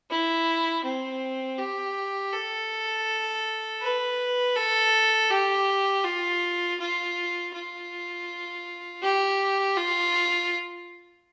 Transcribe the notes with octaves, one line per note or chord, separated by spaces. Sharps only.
E4
C4
G4
A4
B4
A4
G4
F4
F4
F4
G4
F4